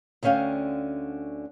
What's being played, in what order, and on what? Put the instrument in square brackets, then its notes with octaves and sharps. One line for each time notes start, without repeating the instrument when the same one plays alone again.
[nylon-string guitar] D2 D3 C#4 F5 G5